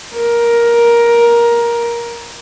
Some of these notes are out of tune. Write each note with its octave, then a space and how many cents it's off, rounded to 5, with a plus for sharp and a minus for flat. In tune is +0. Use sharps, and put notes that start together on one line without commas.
A#4 +15